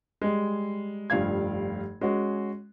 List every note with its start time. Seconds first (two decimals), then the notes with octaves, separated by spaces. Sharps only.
0.21 G3 G#3
1.10 F1 G2 F3 F5 G#6
2.01 G#3 C#4 F#4